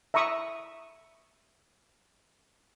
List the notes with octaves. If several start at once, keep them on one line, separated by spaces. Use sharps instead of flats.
E5 A#5 B5 C#6 D#6